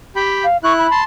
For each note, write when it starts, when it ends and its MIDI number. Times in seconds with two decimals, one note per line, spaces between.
0.16 0.45 67
0.16 0.45 79
0.16 0.45 83
0.44 0.57 77
0.64 0.87 64
0.64 0.73 85
0.64 0.87 90
0.78 1.00 83
0.91 1.04 81
0.91 1.04 84